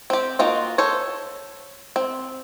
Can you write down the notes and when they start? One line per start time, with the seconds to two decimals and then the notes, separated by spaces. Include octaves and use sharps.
0.10 C4 G4
0.39 A#3 D#4 F4 F#4
0.78 A4 C5 C#5
1.96 C4